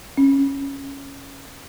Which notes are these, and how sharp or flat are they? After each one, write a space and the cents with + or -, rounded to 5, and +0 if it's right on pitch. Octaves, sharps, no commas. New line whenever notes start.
C#4 -5